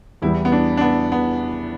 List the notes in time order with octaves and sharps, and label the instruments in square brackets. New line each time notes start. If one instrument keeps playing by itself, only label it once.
[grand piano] E2 E3 G3 [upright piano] E4
[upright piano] B3
D4
D4
B3
B3